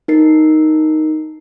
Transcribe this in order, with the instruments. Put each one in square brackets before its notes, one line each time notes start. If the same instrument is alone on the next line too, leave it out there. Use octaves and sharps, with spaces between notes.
[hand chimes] D#4 A#4 C7